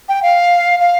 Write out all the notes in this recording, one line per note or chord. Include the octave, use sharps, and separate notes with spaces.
G5
F5
F5